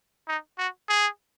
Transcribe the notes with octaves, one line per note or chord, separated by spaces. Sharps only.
D#4
F#4
G#4